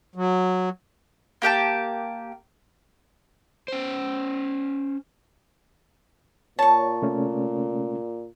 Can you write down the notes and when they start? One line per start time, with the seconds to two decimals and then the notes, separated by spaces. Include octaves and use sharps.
0.16 F#3
1.42 A#3 G4 G5 A5
3.68 C#4 C5
6.59 A#2 C#5 A5 C#6
7.02 C3 A3 C#4